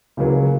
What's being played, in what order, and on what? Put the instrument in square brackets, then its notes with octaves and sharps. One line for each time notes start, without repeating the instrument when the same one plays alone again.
[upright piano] C#2 C#3 F#3 A#3